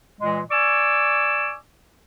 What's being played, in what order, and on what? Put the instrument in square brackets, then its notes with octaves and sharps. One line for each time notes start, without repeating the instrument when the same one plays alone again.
[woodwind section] A#2 E3 G#3
D5 G#5 C#6 D6 E6